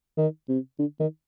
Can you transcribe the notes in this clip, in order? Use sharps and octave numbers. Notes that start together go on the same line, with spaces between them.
D#3
C3
D3
D#3